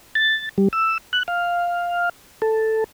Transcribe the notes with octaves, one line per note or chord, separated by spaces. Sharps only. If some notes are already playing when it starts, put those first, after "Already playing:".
A6
G3
E6
F#6
F5
A4